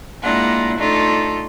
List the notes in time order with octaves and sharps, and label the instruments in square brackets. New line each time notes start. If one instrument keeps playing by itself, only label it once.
[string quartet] G#3 A#3 D4 E4 F4 F#5
A3 D4 D#4 F4 A4